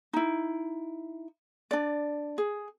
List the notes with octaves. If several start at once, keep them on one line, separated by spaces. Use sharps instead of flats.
D#4 E4
D4 D5
G#4